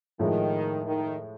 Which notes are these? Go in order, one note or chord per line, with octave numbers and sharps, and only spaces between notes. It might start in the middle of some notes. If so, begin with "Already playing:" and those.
A2 D#3 F3 G#3
D#3